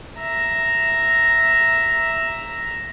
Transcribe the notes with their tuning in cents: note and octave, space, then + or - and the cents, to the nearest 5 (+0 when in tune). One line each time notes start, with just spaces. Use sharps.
E5 +0 A#5 +0